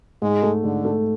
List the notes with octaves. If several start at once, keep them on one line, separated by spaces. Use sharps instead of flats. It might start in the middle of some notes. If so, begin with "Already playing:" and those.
G#2 G#3
A3
G#2 D3
A3